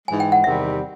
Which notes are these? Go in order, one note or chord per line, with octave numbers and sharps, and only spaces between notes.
G#2 E3 G#3 G#5
G5
F#5
E2 C3 D#3 G3 C4 E5